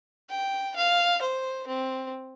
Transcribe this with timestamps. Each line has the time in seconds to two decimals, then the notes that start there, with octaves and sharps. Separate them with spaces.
0.30 G5
0.76 F5
1.22 C5
1.68 C4